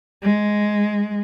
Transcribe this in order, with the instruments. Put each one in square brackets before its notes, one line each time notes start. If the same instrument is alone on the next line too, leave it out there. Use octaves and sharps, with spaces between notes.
[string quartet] G#3